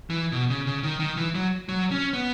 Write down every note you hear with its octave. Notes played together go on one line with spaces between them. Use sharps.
E3
B2
C#3
C#3
D#3
D#3
E3
F#3
F#3
C#4
B3